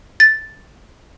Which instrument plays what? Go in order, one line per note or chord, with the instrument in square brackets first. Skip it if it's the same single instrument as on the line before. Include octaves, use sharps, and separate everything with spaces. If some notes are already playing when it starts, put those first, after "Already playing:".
[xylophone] A6